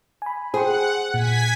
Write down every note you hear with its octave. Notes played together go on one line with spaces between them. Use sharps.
G#5 B5
G#4 C5 F#5 G5 C6
A#2 G#5 G#6 B6